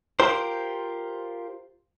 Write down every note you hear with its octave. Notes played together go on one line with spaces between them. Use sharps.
F4 G4 A#4 C5